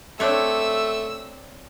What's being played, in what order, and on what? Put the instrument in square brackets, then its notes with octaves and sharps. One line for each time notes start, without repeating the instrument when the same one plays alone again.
[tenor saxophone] A3 [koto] C4 D4 C#5 [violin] E6